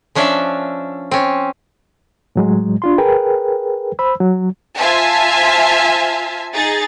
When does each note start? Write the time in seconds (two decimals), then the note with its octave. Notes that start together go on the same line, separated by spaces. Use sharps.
0.15 F3 C#4 D4 D5 E5
1.11 C4 C#4
2.36 A2 F#3 G#3
2.82 D4 F4 C6
2.98 G#4 A#4 B4 G5
3.99 C5 B5 E6
4.20 F#3
4.77 F4 C5 E5 G#5 A5
6.54 D#4 G#4 A6